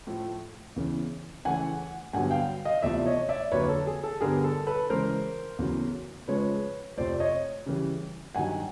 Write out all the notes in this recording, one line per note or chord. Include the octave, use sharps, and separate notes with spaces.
A2 F3 A3
E2 C#3 E3
C#3 E3 A3 F#5 G#5
G2 D3 F#3 B3 F#5 G#5
F5 G5
D#5 F5
E2 C3 F3 A3 D5 E5
C#5 D#5
D5 E5
F2 D3 F#3 A#3 B4 C#5
A4
G#4
A4
G2 D3 G3 B3 G#4 A#4
A4
A4 B4
C#3 E3 G#3 A#4 C5
E2 C#3 F#3 A3
C#3 F3 G#3 B4 C#5
F2 C3 F3 A3 C5 D5
C#5 D#5
C#3 E3 G3
G2 D#3 F#3 F#5 G#5